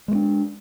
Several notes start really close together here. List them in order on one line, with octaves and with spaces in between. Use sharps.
G#3 A#3 D4